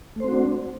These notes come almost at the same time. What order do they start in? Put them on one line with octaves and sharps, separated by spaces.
A3 C5 C4 F#4 D4